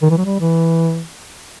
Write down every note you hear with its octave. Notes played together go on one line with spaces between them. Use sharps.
D#3
E3
F#3
G3
E3